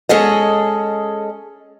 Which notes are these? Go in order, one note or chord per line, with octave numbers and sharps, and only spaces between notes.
G#3 C#4 G#4 A4 D#5